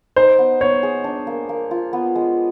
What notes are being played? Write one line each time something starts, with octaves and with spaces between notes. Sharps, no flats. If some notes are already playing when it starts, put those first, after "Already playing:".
D#4 C5
B3
B3 C#5
G#4
D4
A#3
A#3
F4
B3
G#3